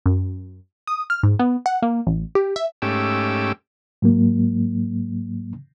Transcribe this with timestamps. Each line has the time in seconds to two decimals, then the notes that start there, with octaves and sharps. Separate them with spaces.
0.06 F#2
0.87 D#6
1.10 F6
1.23 G#2
1.39 B3
1.66 F#5
1.82 A#3
2.07 A1
2.35 G4
2.56 E5
2.82 G#2 A3 C#4 G4 D6 E6
4.02 G#2 F#3 A#3